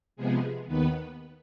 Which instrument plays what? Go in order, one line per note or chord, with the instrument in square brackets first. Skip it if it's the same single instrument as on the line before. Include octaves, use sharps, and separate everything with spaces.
[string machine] C3 F3 G#3 B3 G#4
D#2 D#3 B3 B4